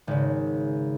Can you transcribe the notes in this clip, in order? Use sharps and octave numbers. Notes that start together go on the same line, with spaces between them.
G#1 C#3